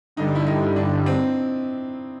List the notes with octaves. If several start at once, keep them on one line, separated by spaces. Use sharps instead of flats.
G2 D3 G3 D#4
E4
D#4
D4
C4